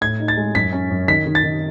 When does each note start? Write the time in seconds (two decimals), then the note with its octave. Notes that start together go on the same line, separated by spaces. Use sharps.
0.01 A2 G#6
0.20 D#4
0.28 A6
0.37 G#3
0.55 F#2 B6
0.72 C#4
0.91 F#2
1.08 D#3 B6
1.26 D#3
1.35 A6
1.44 D#3